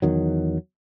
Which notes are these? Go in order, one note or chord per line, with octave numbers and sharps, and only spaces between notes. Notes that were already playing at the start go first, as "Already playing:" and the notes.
E2 D#3 F#3